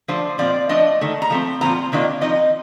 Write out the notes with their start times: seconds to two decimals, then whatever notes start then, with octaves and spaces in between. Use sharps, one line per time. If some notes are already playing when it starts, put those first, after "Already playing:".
0.08 F3 A3 D4 C5
0.38 A#2 F3 C4 F4 D5
0.69 F3 A3 D4 D#5
1.01 D#3 A3
1.22 A#5
1.30 F3 A3 C4
1.61 A#2 F3 C4 F4 A#5
1.92 C3 D#3 A#3 D4 F4
2.21 F3 C4 D#4 D#5